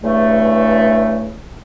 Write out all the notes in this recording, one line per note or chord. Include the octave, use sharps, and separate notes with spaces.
E2 G2 C#3 A3